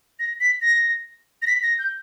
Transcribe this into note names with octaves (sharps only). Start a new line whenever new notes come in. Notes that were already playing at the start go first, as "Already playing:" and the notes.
A#6
B6
A#6
A#6
B6
A#6
G6